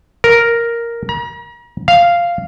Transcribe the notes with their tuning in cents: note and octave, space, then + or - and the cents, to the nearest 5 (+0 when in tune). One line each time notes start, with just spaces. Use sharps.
A#4 +0
A#5 +40
F5 -5